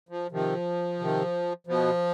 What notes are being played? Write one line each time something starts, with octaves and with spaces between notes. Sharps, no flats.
F3
C3 D#3 F3
C3 D#3
B2 F3